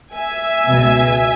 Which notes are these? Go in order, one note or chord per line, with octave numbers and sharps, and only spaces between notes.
E5 G#5
C#2 B2